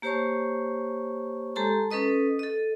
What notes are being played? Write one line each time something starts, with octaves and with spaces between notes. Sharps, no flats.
A#3 G4 C5 C#5 A5 C#6
G#3 G4 A4 A5 A#5 C6
C#4 A4 B4 D#5 D#6
A4 D#5